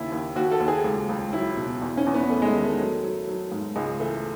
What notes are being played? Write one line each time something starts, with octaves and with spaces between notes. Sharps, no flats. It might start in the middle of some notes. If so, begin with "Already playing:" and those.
Already playing: D#2 C#3 E4
D#2
D#2 F#4
A4
D#2
G#4
C#2
C#2
F#3 E4
B2
E2
C#4
E2
B3
E2 A3
G#3
A3
D#3
A3
F#3
F#3
F#3
G#2
C#2 G#3
E3 A3